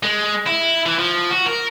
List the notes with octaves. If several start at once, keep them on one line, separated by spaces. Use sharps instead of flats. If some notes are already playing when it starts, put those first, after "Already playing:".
G#3
E4
E3
F3
F#4
A#4